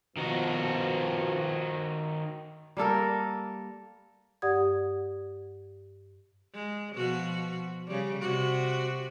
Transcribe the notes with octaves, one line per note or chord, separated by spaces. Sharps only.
B2 D#3 F3 D#4 F#4
G3 A#3 A4 A#4
G2 G4 D5 F#5 D#6 G#6
G#3
B2 F3 F#4
C#3 G3
C3 F#4